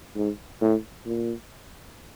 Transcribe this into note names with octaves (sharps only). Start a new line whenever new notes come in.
G#2
A2
A#2